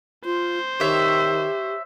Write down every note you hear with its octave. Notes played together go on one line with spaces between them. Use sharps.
F4 C5
D#3 G4 C#5 E5